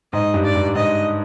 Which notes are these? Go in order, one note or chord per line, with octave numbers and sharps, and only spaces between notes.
G#2 D#5
G2
D5
G2
G#2 D#5